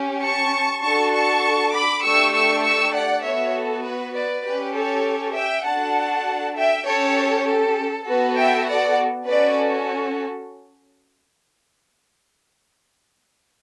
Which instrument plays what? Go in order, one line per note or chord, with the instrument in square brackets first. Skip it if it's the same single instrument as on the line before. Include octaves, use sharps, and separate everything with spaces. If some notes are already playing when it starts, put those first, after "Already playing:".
Already playing: [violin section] C#4 G4
A5 C#6
D4 F#4 A4 A5 C#6
A5 C#6
B5 D6
A3 D4 G4 C#6 E6
C#6 E6
C#6 E6
D5 F#5
B3 F#4 A4 C#5 E5
A4
B4
B4 D5
C#4 G4 B4
A4 C#5
E5 G5
D4 F#4 A4 F#5 A5
E5 G5
C#4 G4 A4 C#5
A4
B3 F#4 A4 B4
E5 G5
D5 F#5
C#4 F#4 A4 B4 D5